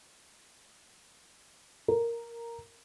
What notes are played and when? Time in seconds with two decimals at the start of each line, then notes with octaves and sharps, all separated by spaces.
1.88 A#4